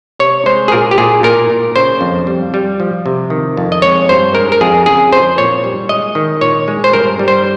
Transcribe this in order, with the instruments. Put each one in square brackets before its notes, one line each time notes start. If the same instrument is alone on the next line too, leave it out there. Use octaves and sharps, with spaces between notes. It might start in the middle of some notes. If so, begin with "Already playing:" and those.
[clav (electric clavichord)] C3 C#5
G#3 C5
G#4
A#2 A#4
G4
A#2 G#4
A#2 A#4
A#2
C#3 C5
F2
G3
G3
F3
C3
D#3
F2
D#5
G#3 C#5
G2 C5
G#3 A#4
A#4
F2 G#4
C#3 G#4
F2 C5
A#2 C#5
G3
G#3 D#5
D#3
A#2 C#5
G#3
C5
G2 A#4
G3
C5